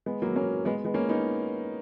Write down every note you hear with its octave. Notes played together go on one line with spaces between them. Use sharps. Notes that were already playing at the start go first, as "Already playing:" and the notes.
G#3 B3
F#3 A#3
A#3 C#4
G#3 B3
G#3 B3
A#3 C#4
B3 D#4